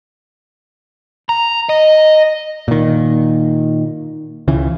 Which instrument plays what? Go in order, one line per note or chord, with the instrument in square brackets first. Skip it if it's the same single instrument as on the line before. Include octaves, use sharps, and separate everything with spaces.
[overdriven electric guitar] A#5
D#5
[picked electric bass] A#2 D#3
C#2 C#3 E3